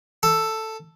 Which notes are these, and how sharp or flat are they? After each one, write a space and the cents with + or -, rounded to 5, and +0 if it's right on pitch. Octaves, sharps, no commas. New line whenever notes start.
A4 +5